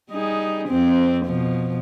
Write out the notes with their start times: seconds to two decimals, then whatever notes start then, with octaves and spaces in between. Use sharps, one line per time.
0.10 G3 D#4 G#4
0.68 F2 C4
1.26 B2 F3